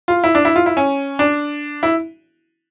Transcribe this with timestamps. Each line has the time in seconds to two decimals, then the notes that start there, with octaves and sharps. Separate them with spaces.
0.08 F4
0.24 E4
0.35 D4
0.45 E4
0.56 F4
0.66 E4
0.77 C#4
1.19 D4
1.83 E4